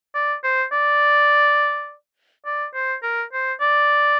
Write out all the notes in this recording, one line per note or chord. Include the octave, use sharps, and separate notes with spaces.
D5
C5
D5
D5
C5
A#4
C5
D5